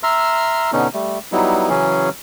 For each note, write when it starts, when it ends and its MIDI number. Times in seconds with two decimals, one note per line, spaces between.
0.03 0.71 76
0.03 0.71 82
0.03 0.71 84
0.03 0.71 88
0.03 0.71 89
0.73 0.88 47
0.73 0.88 50
0.73 0.88 59
0.73 0.88 61
0.73 0.88 63
0.94 1.19 55
0.94 1.19 57
1.32 1.69 54
1.32 1.69 55
1.32 1.69 59
1.32 1.69 63
1.32 1.69 64
1.70 2.10 49
1.70 2.10 52
1.70 2.10 54
1.70 2.10 61
1.70 2.10 68